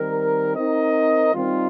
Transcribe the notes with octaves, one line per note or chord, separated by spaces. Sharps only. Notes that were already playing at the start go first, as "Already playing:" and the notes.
Already playing: D#3 G3 C4 D#4 A#4
C4 D#4 A#4 D#5
D#3 G3 C4 F4